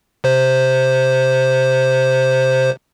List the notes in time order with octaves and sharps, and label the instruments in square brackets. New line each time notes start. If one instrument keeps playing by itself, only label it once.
[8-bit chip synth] C3 C5